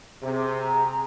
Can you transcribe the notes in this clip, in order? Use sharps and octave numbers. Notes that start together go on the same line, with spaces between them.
C3 G#4
A#5
G#4